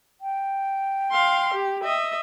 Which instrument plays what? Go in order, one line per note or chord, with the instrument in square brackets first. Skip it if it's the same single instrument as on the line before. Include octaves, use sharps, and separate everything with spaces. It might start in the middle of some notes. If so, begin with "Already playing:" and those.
[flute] G5
[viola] F5 C6
G4
D#5 E5